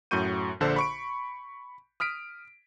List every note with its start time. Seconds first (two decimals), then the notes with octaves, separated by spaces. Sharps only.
0.11 F#2 A2 F#4 C#6 G6 D#7
0.60 A#1 D3 A4 C5
0.76 B5 C#6 D7
2.00 D#6 F6 B6 D7